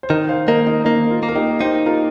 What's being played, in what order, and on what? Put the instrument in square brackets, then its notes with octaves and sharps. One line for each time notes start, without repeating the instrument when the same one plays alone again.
[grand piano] C5
[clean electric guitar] D#3 [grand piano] A#4 D#5
[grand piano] C5 F5
[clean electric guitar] A#3 [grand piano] A#4 D#5
[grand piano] D#4
[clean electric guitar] A#3 [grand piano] D#4
[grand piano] F4
[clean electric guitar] A#3
[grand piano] A#4
D#4 G4
[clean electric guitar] D#4 [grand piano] G4 C5
[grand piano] F4 A#4